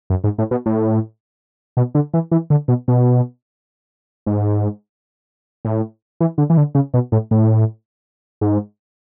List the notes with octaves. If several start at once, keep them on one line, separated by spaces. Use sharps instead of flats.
F#2
G#2
A2
B2
A2
B2
D3
E3
E3
D3
B2
B2
G#2
A2
E3
D3
E3
D3
C#3
B2
A2
A2
G#2